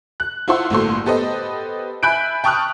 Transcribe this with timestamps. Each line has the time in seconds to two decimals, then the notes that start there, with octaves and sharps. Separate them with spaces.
0.20 F#6
0.48 E4 F4 C5 F#5 C6 E6
0.70 G1 A2 A3 A#3 F#4 C6
1.06 B3 G4 A4 B4 C5 D#5
2.03 E5 G#5 B5 F#6 G6 D7
2.44 G5 A5 C#6 D#6 F6 F#6